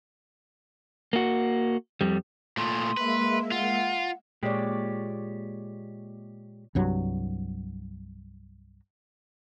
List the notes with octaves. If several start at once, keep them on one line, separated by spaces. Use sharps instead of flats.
A#3 F#4
F2 G3
A#2 A3 B5 C6 D#6
G#3 A#3 B4 E5
F4 F#5
A#2 G#3 G4 C#5 D5
C2 G2 F#3